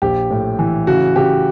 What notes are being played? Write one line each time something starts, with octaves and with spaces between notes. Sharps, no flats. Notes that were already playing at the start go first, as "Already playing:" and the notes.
A#1 G4
A2
E3
C#3 F#4
C#3 G4